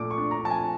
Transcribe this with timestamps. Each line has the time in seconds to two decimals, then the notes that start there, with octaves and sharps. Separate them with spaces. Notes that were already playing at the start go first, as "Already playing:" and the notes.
Already playing: A#2 F3 A3 D6
0.11 C#6
0.18 D4
0.31 A#5
0.44 F3 A5
0.50 G#5